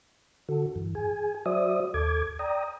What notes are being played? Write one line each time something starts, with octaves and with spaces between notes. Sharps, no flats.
D3 F#4 A4
G2 E3
G#4 G#5
F#3 F#4 C5 D5 E5 D#6
D#2 A4 D6 G#6
D5 G5 A#5 D#6